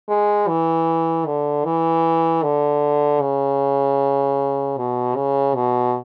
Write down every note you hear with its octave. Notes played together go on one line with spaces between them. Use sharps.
G#3
E3
D3
E3
D3
C#3
B2
C#3
B2